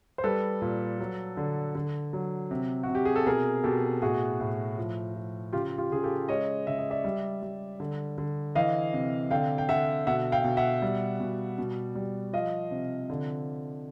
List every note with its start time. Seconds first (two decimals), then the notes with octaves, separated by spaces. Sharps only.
0.18 C5
0.24 G3 A4 B4
0.62 A#2
1.00 F#3
1.37 D3
1.75 D3
2.13 F#3
2.51 C3
2.83 F#4
2.89 C3
2.95 G4
3.05 G#4
3.16 A4
3.26 B2 G#4 A#4
3.64 B2 G4 A4
4.02 A2 F#4 G#4
4.40 A2
4.78 F3
5.16 F3
5.53 C#3 F4 G4
5.78 F4 G4
5.91 C#3 G#4
6.03 G4 A4
6.29 G#3 C#5 D#5
6.67 C#3 E5
6.79 D#5
6.91 D5 E5
7.04 G3
7.42 G3
7.80 D3
8.18 D3
8.55 E3 D#5 F5
8.93 C3
9.31 D3 F5 G5
9.58 G5
9.69 D3 E5 F#5
10.07 B2 E5 F#5
10.32 F5 G5
10.44 B2
10.57 E5 F#5
10.82 G3
11.20 B2
11.58 B2
11.95 G3
12.33 F3 D#5 F5
12.71 C3
13.09 D3